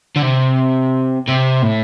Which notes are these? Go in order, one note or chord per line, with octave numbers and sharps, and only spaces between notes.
D3
C3
C3
A2